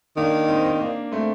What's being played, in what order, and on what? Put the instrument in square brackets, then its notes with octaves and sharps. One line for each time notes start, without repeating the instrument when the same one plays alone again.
[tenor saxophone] D#3 [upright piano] A#3 D4
[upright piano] C4 D#4
C4 D#4
A#3 D4
A3 C4